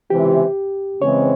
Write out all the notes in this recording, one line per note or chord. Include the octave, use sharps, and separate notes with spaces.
C#2 C3 E3 G4
C#3 E3 G#3 C4 C#5